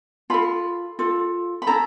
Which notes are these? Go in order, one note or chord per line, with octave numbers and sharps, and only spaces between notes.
F4 A4 B5
F4 A4
B5
C#4 E4 A4 A#5